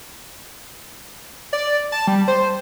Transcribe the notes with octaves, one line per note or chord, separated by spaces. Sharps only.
D5
A5
G3
C5